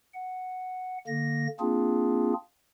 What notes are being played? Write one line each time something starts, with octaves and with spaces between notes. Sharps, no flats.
F#5
D3 A#3 A#6
A#3 C4 D4 F4 G#4